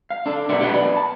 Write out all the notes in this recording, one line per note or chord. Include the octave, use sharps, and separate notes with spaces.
F5
D4 A4
B2 D4 A#4 D5 E5 F#5
G4 D#5 E5 F#5
B3 D5
A5